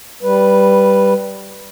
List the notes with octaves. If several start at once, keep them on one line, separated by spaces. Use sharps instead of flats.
G3 B4